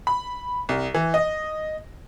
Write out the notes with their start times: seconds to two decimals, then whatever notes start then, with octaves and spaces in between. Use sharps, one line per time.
0.07 B5
0.69 C2
0.94 E3
1.14 D#5